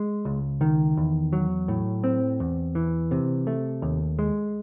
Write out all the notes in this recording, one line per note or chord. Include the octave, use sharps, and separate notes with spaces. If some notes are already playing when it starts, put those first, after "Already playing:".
Already playing: G#3
C#2
D#3
E2
F#3
A2
C4
E2
E3
C3
A3
D#2
G#3